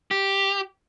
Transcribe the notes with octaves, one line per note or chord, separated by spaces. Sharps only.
G4